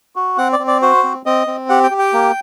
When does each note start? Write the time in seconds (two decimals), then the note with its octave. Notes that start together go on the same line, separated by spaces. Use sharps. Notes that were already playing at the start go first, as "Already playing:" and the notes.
0.16 F#4
0.38 C4 F#5
0.53 D5
0.59 C4
0.67 D5
0.82 F#4 C5
1.04 C4
1.26 C4 D#5
1.47 C4
1.69 G4 F#5
1.83 G5
1.91 G4
1.99 G5
2.13 A#3